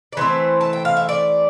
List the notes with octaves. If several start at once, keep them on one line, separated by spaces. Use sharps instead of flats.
D5
E3 A3 C4 C5
A5
G5
F5
E5
D5